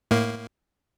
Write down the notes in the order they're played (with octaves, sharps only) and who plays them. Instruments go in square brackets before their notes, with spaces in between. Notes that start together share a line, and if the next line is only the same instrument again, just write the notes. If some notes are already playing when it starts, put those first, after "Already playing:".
[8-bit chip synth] A2 A#3